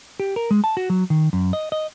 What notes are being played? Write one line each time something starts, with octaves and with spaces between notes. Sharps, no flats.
G4
A#4
G#3
A5
F#4
F#3
D#3
F#2
D#5
D#5